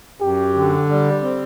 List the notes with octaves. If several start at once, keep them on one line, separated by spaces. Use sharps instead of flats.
F#2 G4
D3
G3
C4